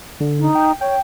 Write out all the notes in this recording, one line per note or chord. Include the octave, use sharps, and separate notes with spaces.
D3
D#4
G5
C#5 G5